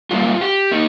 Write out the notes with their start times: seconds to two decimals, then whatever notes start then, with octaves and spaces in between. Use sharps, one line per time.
0.11 G#2 G3 A#3 F4
0.41 G4
0.71 A#3 D#4